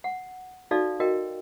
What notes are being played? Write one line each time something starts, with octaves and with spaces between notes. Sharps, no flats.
F#5
D#4 F#4 A4 D5 F5
F#4 A#4 D#5 G5